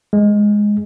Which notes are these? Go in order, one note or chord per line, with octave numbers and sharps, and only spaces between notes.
G#3